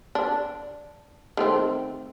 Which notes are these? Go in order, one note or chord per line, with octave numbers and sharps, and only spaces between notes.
D4
D#3 A3 C4